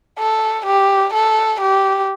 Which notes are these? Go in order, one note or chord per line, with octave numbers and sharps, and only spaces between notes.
A4
G4
A4
G4